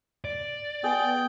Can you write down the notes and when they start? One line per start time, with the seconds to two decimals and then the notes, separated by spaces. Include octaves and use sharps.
0.25 D5
0.84 B3 G#4 G5